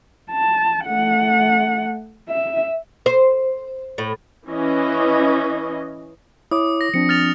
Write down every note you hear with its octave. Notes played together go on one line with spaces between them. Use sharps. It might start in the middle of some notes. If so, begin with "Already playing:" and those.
A5
A3 F#5
E5
C5
A2
E3 C#4 D#5
E4 C#5 D6 D#6
A#6
F3 C4 D4 C#7
F6 A6 F7